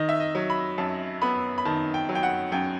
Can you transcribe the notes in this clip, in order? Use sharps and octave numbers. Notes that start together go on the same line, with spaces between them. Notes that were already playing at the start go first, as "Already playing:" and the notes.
Already playing: D#3 D#5
E5
D#5
F#3
B5
F#2 A5
B3 B5
B5
D#3 A5
G5
F#3
G5
F#5
F#2 G5